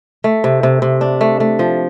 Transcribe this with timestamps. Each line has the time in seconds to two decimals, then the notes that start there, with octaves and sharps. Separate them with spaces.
0.24 A3
0.44 C3
0.63 C3
0.82 C3
1.01 D4
1.21 A3
1.40 A3
1.59 F3